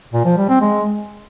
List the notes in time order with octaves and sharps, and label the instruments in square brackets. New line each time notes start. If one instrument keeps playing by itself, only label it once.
[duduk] A#2
F3
G3
C4
G#3